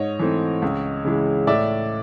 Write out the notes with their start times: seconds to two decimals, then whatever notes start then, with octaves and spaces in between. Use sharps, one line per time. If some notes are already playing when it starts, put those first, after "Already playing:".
Already playing: G#2 C#5 D#5
0.19 E3 A3 C4
0.62 C#2
1.05 C#3 E3 G#3
1.47 A2 D5 E5